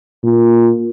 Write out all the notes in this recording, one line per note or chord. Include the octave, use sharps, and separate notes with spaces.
A#2